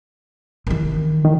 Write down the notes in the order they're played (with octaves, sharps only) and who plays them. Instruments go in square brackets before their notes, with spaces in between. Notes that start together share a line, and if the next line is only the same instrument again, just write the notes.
[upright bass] D#3 E3
[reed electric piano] D#3